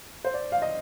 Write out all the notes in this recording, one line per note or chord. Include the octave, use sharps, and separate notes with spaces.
C5
D5
F5
D#5